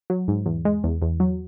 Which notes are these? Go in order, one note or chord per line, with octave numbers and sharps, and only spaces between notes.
F#3
G#2
E2
G#3
E2
E2
F#3